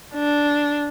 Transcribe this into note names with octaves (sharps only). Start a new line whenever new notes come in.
D4